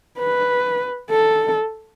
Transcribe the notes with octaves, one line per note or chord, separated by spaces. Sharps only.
B4
A4